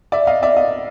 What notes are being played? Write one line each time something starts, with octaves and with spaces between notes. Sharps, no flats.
D5 E5
D#5 F5
D5 E5
D#5 F5